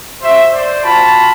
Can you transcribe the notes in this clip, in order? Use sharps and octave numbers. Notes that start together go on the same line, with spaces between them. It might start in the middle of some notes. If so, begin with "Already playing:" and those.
F#4 C5 E5
C5 D5
F4 F#4 A5 B5